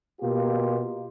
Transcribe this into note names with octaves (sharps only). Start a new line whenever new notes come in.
B2 A#3 F4 G4